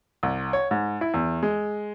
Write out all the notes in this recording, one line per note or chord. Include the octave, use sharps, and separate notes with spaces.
C2
C#5
G#2
E4
E2
G#3